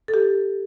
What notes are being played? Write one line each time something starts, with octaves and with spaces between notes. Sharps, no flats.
A4
G4